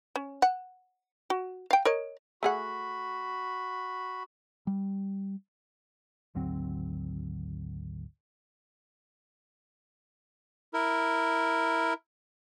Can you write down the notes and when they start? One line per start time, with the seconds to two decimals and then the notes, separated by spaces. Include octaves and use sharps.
0.16 C#4
0.42 F#5
1.30 F#4
1.71 F5 G5
1.85 A#4 C#5 D#5
2.43 A3 F#4 G#4 F#5 B5
4.67 G3
6.35 G#1 D2 F#3 C4
10.74 E4 A#4